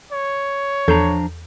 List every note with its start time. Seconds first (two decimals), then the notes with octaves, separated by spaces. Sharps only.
0.12 C#5
0.88 E2 F3 D4 A4 A#5 G6